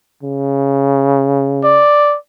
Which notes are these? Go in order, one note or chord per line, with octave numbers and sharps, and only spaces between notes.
C#3
D5